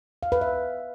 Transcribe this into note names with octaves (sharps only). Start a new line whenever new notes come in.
F5
B4
E5